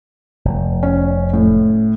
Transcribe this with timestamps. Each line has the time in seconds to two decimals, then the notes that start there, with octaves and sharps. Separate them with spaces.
0.45 F1
0.83 C#4
1.33 A2